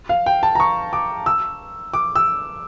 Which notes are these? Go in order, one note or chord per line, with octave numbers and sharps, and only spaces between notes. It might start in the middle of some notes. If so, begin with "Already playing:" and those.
F5
G5
A5
A#5
C#6
D6
E6
D6
E6